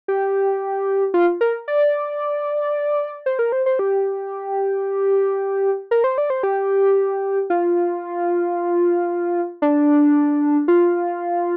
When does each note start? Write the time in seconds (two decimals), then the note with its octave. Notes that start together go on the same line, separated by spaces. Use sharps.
0.08 G4
1.14 F4
1.41 A#4
1.68 D5
3.26 C5
3.39 A#4
3.52 C5
3.66 C5
3.79 G4
5.91 A#4
6.04 C5
6.18 D5
6.30 C5
6.43 G4
7.50 F4
9.62 D4
10.68 F4